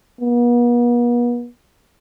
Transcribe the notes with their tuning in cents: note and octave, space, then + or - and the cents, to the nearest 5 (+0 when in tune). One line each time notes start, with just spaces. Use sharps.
B3 -45